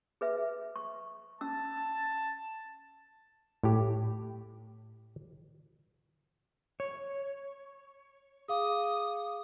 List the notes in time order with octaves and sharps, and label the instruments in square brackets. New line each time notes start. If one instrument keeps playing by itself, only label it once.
[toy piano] G#4 B4 E5
C#6
[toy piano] C#4 E6 [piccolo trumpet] A5
[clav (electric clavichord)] A2 G4
[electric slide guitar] C#5
[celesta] G#4 F5 D6 [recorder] D#6